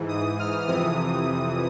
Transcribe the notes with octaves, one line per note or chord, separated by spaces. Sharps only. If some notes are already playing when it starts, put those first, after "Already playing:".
Already playing: G#2 E3
D#6
F6
F2 C3 E3 D#6